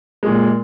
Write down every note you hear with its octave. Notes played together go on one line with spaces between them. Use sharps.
A#2 G#3